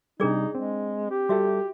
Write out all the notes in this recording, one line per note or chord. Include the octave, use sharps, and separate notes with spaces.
C3 G3 D4 D#4 G#4 D5
G#3 C4
G4
G3 F#4 A4 E5